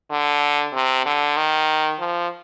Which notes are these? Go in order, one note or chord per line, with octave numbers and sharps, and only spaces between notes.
D3
C3
D3
D#3
F3